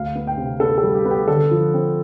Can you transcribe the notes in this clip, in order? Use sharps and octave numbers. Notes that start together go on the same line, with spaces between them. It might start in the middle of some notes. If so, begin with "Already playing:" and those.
Already playing: D2 F5
B3
G5
C3
B3 A4
A4
G3
G4
B3
G4
D3 A4
F3
C4